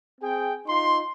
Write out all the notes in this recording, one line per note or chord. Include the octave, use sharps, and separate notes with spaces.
C4 G#4 G5
D#4 F4 C6